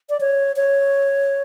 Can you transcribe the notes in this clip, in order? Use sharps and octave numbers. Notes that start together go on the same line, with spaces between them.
D5
C#5
C#5